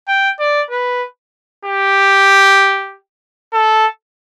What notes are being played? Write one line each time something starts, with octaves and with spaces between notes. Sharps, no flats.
G5
D5
B4
G4
A4